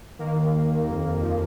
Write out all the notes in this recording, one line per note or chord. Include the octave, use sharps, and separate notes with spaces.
D#3 A#3
D#2
D#2
D#2
F2
F2
F3